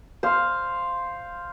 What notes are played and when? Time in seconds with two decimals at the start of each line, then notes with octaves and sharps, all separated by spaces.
0.23 C5 F5